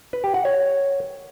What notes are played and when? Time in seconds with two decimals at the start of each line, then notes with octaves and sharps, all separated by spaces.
0.13 B4
0.24 G4
0.34 F#5
0.45 C#5